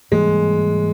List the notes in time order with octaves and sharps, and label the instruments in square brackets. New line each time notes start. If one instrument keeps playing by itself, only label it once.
[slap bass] G#2 E3 G3 A#3 [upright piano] G#3